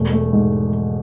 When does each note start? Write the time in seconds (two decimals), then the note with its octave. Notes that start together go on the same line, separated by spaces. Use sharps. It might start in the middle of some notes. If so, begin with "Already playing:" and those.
Already playing: E1 A3
0.13 A3
0.33 G#2